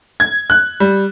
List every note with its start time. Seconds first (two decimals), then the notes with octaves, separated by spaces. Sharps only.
0.20 G#6
0.50 F#6
0.80 G3